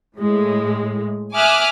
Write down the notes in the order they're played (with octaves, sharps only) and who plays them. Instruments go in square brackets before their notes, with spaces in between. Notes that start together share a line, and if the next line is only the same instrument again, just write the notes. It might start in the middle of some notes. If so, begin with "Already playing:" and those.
[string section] A2 G#3
E5 G#5 D6 D#6 F6 F#6